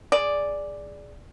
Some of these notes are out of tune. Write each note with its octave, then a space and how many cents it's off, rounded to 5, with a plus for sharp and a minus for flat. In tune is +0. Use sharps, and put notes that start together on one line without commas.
G#4 +0 D5 +0